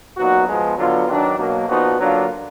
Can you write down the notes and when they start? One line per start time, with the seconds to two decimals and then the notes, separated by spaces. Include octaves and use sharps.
0.17 A#2 F#3 B3 D#4 F#4
0.48 F3 G#3 B3
0.78 D3 F#3 B3 F4
1.08 D#3 F#3 D4
1.38 B2 F#3 A#3
1.68 A#2 F3 B3 D#4 F#4
1.99 D3 F#3 A#3 D4 F4